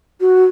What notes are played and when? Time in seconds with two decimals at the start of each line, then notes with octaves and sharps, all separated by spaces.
0.20 F#4